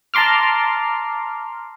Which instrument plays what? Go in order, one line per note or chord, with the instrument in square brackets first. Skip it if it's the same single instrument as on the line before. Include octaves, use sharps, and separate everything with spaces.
[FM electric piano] A5 A#5 C6 D6 F6